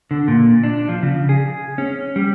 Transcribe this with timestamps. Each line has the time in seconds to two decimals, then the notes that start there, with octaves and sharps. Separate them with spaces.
0.11 D3
0.28 A#2
0.63 D4
0.89 F3
1.03 C#3
1.29 G#4
1.78 C#4
2.16 G3